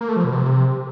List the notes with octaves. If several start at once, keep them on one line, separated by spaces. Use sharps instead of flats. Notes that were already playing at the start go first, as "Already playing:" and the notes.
A#3
A3
F3
B2
C3